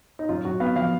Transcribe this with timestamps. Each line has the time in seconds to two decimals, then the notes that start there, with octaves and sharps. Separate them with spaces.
0.19 D#4
0.29 F#2 F4
0.45 F#2 F#4
0.60 B3 F5
0.76 F3 F5